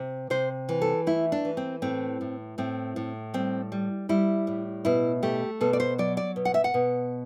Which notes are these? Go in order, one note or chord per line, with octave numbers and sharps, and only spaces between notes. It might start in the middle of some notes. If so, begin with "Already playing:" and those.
Already playing: C3
C3 C5
E3
A4
A3 E4
D4
E3
C4
A2 C4
A2
A2 C4
A2
G3 C4
G3
G3 E4
A2
B2 E4
A3 G4
B2 A4
D5
C5
F#3 D5
D5
B2
F#5
E5
F#5
B2